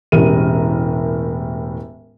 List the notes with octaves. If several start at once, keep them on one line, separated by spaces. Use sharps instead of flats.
E1 A2 C#4 G4 A#4 D#7